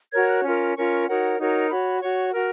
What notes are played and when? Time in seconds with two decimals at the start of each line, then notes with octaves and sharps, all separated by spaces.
0.13 F#4 A#4 C#5 G#6
0.29 F#6
0.44 C#4 F4 A#4 F6
0.76 C#4 F4 A#4 C#6
1.07 D#4 F#4 A#4 C#5 F#5
1.39 D#4 F#4 A#4 C#5
1.70 F#4 C#5 B5
2.02 F#4 C#5 C#6
2.33 F#4 A#4 F6